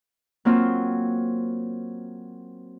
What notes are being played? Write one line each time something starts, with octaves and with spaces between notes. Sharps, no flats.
F#3 A#3 C4 F4